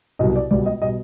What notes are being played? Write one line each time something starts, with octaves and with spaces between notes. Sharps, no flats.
C2 B2 F#3 D#5
D5
C#2 B2 G3 D5
D#5
B2 G3 D#5